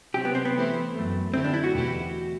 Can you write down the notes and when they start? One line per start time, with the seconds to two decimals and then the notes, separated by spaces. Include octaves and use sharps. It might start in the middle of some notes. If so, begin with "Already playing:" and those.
0.14 C3 F#3 C4 G4
0.25 B3
0.35 C4
0.45 B3
0.55 E3 A3 C4 E4 G4
0.94 F#2 F#3 A3
1.34 D3 A3 C4 E4 G4
1.44 D4
1.54 E4
1.64 F#4
1.74 E2 B2 A3 E4 G4